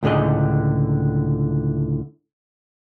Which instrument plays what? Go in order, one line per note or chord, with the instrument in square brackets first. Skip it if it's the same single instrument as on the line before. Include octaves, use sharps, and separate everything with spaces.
[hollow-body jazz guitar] C#2 A2 D3 G#4 D#5